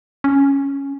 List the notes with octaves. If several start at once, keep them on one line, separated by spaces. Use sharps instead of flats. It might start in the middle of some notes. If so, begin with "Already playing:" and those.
C#4